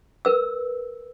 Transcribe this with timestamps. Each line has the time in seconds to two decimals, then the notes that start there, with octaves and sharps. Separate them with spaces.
0.25 A#4 B4 E6